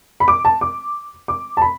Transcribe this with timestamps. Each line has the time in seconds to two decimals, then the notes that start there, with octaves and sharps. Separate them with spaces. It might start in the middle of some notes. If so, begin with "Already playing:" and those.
0.20 B5
0.28 D6
0.45 A5
0.61 D6
1.28 D6
1.57 A5
1.62 B5